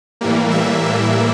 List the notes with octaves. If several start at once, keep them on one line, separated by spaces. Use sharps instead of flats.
A2 E3 G3 A#3
E5
E5